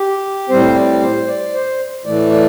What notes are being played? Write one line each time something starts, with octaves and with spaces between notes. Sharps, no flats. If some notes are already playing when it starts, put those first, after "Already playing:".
Already playing: G4
A2 G3 C4 C5
D5
C5
D5
C5
A2 E3 A3 D5
D5